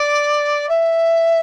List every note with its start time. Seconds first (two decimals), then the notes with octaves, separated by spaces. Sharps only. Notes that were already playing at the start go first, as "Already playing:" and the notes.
Already playing: D5
0.68 E5